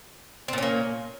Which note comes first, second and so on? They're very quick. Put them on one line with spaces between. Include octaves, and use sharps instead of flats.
C4 A#2 C#4 A#3